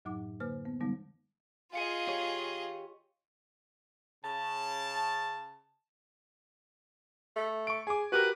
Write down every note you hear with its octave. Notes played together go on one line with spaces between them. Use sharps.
F#2 A2 F#3 D#4 F#5 D6
D3 A#3 B4 C5 F6
B3
D3 E3 G3 G#3 B3 D#4
F4 G#4 D#5 F5 C#7 D#7
G4 C#5
C#3 A5
A3
C#6 D7
G#4 G#5 D6
F#4 G4 A#4 B4